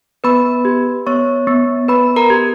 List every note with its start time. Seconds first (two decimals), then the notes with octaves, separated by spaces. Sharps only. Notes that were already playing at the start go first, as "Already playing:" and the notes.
0.24 B3 B4 B5
0.65 G4
1.06 B3 C#5 C#6
1.47 B3
1.88 B3 B4 B5
2.16 A#4 A#5
2.30 G4